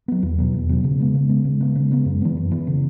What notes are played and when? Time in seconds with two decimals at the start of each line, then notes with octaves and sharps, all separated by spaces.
0.08 F#3 B3
0.23 E2
0.38 B2 F#3 B3
0.54 E2
0.69 B2 F#3 B3
0.84 C#3
1.00 G#3 B3
1.14 C#3
1.29 G#3 B3
1.45 C#3
1.61 G#3 B3
1.75 C#3
1.91 G#3 B3
2.05 F#2
2.22 E3 B3
2.37 F#2
2.52 E3 B3
2.67 C#3